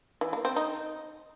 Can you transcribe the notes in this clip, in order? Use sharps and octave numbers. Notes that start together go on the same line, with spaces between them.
E3
A#3
C4
D#4